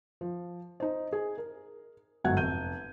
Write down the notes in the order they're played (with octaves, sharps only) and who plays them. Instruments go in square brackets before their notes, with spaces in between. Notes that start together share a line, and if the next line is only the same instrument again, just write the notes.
[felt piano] F3
D#4 C5
G#4
A#4
G1 G#2 F#3 F#5 G#6
F1 G6 D#7